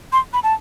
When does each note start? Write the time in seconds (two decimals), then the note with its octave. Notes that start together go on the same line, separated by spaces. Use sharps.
0.12 C6
0.33 B5
0.43 A5